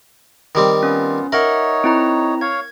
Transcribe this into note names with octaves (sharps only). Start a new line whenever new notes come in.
D#3 G3 C4
B3 C#4 F4
D#4 A#4 C#5 E5 F#5
C4 E4 A#5
C#5 F5 G#6